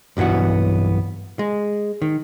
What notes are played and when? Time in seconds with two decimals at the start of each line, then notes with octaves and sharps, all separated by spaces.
0.17 B1 G2 E3 B3 F#4
1.39 G#3
2.02 D#3